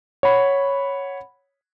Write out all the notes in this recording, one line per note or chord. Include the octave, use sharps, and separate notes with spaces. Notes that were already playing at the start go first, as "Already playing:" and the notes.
C#5 F#5 B5